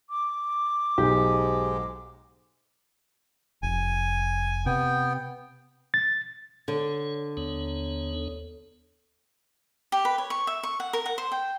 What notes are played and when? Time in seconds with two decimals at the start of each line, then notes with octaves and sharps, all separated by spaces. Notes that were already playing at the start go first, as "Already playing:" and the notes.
0.10 D6
0.98 B1 G#2 G#3 G4
3.63 F1 G#5
4.66 C3 B3 G5
5.94 A6
6.68 D3 C#5
7.37 D#2 B3 C#5
9.92 G4
10.05 B4
10.18 C#5
10.30 C#6
10.47 E5
10.63 C#6
10.80 F#5
10.93 A#4
11.06 F#5
11.18 C5
11.32 G5